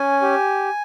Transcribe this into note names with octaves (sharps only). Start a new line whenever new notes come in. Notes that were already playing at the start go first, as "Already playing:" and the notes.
Already playing: C#4 G#5
G4